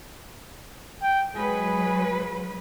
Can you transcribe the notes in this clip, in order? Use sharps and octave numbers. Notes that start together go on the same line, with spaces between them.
G5
F#3 G#3 G#4 B4